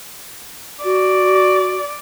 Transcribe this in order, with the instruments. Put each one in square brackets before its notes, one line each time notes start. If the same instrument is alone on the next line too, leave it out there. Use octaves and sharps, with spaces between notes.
[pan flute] F#4 [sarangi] D5